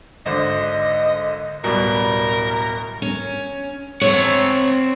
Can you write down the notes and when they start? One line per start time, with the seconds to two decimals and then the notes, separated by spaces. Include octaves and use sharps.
0.26 G#1 D3 C5 D#5
1.64 D1 B2 G3 A#4
3.02 C#4
4.01 C4 C#5 F#5